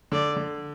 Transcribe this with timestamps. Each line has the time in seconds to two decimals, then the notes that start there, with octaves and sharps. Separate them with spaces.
0.12 D3 D5
0.36 D3